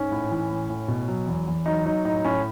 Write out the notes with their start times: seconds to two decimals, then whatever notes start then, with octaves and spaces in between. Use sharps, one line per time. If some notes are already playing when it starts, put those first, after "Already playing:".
Already playing: G#2 C#4
0.11 A2
0.31 E3
0.50 A2
0.70 A2
0.88 B2
1.08 F#3
1.27 E2
1.47 E2
1.66 F#3 D#4
1.85 F#3 D#4
2.05 A2 D#4
2.24 A2 C#4